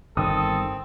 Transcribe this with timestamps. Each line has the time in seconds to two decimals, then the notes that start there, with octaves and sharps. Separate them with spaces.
0.17 G1 D#3 C4 A4 D#6